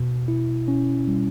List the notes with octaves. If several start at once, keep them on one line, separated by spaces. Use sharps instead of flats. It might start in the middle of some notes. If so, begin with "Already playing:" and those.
Already playing: B2
E4
C#4
G3